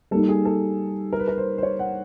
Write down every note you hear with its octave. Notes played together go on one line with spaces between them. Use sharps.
G3 A#3 D#4 A4
G#4
A4
A#4
B4
A#4
C5
C5
C#5
F#5